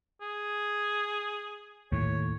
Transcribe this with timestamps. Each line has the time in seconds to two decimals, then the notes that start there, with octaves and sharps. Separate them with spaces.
0.21 G#4
1.92 D#2 A2 C#5